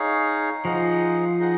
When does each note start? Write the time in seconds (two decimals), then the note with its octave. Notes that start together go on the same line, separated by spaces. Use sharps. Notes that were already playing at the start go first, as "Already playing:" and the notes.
Already playing: D#4 G#4 C#5 F5
0.65 F3 D#4 G#4 D#5 F#5
1.39 D#4 G#4 D#5 F#5